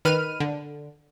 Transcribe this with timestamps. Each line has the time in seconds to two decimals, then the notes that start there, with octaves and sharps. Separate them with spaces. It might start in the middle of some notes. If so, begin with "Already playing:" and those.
0.05 D#3 B4 F6 D#7
0.40 D3